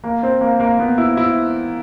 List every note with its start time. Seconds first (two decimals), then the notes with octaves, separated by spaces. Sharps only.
0.04 A#3
0.23 C4
0.41 A#3
0.60 A#3
0.79 B3
0.98 E4
1.17 E4